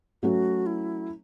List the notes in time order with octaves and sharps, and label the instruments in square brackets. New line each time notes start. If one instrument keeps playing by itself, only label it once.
[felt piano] F#3 A3 C#4 [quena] F#4 G4
[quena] E4